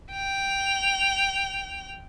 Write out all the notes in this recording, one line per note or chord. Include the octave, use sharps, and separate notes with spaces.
G5 F7